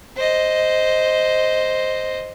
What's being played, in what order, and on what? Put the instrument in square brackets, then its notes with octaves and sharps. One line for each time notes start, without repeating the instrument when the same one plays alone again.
[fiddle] C5 D#5